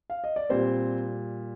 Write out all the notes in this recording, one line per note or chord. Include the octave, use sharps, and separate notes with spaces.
F5
D#5
D5
A#2 G3 C4 C5